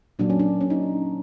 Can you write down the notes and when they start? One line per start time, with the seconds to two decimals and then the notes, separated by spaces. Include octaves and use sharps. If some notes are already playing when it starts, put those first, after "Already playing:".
0.19 A#2 F#3 A#3 D4
0.30 C#4
0.39 D4
0.61 C#4
0.70 D#4